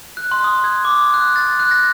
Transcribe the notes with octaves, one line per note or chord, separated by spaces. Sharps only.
F#6
C6
D#6
G#6
D6
F#6
A6
F#6
A#6